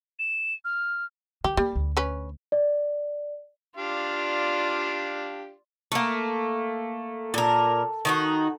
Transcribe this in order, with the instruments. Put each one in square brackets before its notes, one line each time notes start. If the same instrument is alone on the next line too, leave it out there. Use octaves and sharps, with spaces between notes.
[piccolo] E7
F6
[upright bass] D#3 [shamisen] G4
[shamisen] G3 [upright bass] A#3
[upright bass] D2
[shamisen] C#4 B4
[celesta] D5
[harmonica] D4 G4 F5 [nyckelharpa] F4 D5
[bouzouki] A3 A#3 [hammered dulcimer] A#4
[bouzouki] A#2 A#4 [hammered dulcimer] A4
[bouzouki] D#3 D#4 F#4